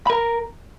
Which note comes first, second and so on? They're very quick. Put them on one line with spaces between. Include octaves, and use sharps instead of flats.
B5 A#4 A#5